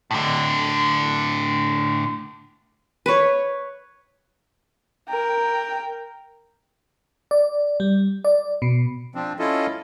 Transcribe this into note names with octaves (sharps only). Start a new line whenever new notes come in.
A2 D3
B4 C#5
A#4 G5
D5
G3
D5
B2
F3 C4 D4
C#4 E4 F4 A4 D#5